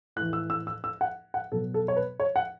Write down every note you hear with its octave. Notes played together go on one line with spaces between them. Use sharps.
A2 E3 F#6
E6
E6
E6
E6
F#5
F#5
B2 F#3 A4
A4
C#5
B4
C#5
F#5